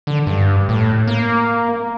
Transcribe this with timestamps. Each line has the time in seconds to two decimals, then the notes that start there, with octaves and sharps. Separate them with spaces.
0.07 D3
0.27 G2
0.69 A2
1.08 A#3